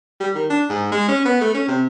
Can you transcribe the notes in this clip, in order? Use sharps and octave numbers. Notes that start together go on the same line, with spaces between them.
G3
D#3
D4
G#2
G#3
C#4
B3
A3
C#4
C3